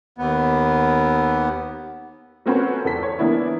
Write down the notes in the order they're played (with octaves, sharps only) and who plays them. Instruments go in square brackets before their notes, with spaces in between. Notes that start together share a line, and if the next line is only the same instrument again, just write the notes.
[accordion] D#2 B3
[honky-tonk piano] A3 A#3 C4 C#4 F#4 B4
E2 A4 B6
C#5
E3 A#3 B3 D4 E4